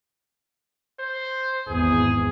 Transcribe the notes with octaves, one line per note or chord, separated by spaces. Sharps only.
C5
G#1 E2 G#4